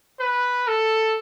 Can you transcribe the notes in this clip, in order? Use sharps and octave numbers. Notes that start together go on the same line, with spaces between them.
B4
A4